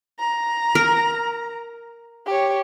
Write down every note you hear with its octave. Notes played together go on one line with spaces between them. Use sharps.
A#5
A#4
G4 C#5